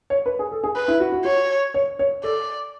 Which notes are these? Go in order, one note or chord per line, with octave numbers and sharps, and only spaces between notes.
C#5
B4
G#4
A4
G#4
B4
E4
F#4
F#4
F#4 C#5
C#5
C#5
A4 D5